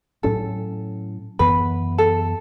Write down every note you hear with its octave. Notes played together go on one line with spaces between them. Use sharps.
A2 F#3 C#4 A4
F#2 E3 B3 B4
A4